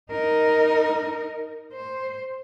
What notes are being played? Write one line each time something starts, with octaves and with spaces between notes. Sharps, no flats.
D#4 A#4
C5